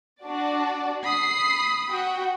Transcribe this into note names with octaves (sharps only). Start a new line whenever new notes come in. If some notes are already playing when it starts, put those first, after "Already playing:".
D4 F#4 D5
B5 D#6 C7
F#4 F#5 G5